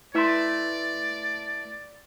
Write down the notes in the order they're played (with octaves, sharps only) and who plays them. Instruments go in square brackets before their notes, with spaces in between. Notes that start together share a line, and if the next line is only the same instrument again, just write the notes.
[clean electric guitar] A3 B4 E5 [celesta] E4 C6 [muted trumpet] D5